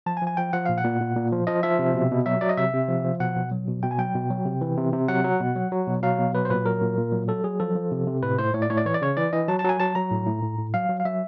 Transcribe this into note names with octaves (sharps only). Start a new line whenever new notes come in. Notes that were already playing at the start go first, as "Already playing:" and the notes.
F3 A5
G#5
F3
G#5
F3 G5
F3 F#5
A#2 F5
F#5
A#2
A#2
A#2
F3
F3 D#5
F3 E5
C3
B2
B2
F#3 E5
F#3 D5
D#5
C3 E5
C3
F3
F3
B2 F#5
B2
F#3
B2
B2 G5
G#5
F#3 G5
B2
F#3
C3
E3
C3
C3
F#3 F#5
F#3
B2
F#3
F#3
B2
F#3 F5
B2
F#3 B4
C5
A#2 B4
F#3 A#4
A#2
A#2
F#3
F#3 A4
F#3 G#4
F3 A4
F3
C3
C3
A2 B4
A2 C5
A2 C#5
D5
A2 C#5
D5
E3 C#5
D5
C#3 C#5
E3 D5
E3 D#5
F#3 A5
A5
F#3 G#5
F#3 A5
F#3 A#5
A2
A2
A2
A2
F#3 F5
F#3
F5
F#3 E5